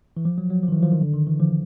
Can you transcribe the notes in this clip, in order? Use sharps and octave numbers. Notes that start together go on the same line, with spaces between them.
E3
F3
F#3
F#3
F3
D#3
E3
F3
D#3
D3
D#3
E3
F3